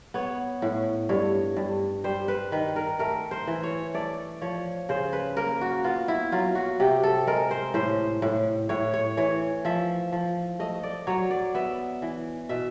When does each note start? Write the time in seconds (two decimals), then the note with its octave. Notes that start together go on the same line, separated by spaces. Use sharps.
0.14 B3 C#5
0.62 A2
1.09 G2 C#5
1.57 G2
2.04 G3 C5
2.28 B4
2.52 D#3 B4
2.76 A#4
2.99 A3 A#4
3.31 C5
3.47 E3
3.63 C#5
3.94 A3 D5
4.41 F3 C#5
4.89 C#3 C5
5.13 B4
5.37 A#3 A#4
5.61 F#4
5.84 B3 F4
6.08 E4
6.32 F#3 F4
6.55 F#4
6.80 C3 G4
7.03 A4
7.27 G#3 A#4
7.51 C5
7.74 A2 C5
8.22 A2
8.69 A2 C#5
8.93 C#5
9.17 E3 C#5
9.65 F3 E5
10.12 F3
10.59 A3 D#5
10.83 D5
11.07 F#3 C#5
11.31 D5
11.54 B3 E5
12.02 E3
12.49 B2 E5